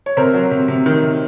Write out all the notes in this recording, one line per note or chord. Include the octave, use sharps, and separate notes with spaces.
C#5
C3 A#4 C5
F#3
C3
C3
D#3
C3